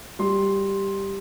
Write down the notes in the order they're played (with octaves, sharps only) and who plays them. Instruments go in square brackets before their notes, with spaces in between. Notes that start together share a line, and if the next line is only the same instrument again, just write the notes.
[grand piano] G3 C6